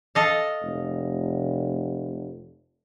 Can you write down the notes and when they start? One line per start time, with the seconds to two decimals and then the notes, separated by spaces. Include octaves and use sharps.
0.15 A4 D#5 F5
0.62 F1